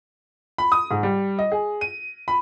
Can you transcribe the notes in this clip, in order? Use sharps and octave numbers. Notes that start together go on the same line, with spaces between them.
B5
D#6
G#2
G3
D#5
G#4
D#7
B5